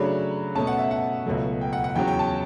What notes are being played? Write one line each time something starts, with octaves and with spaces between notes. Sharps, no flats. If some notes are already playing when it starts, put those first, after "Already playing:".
Already playing: C#3 F#3 A3 D4 B5
B2 A3 C#4 A5
F#5
E5
F#5
C#2 B2 F#3 A3
G5
F#5
F#5
E2 C#3 F#3 C#4 G5
G5
A5